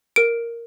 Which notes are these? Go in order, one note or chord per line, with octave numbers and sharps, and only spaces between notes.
A#4 D7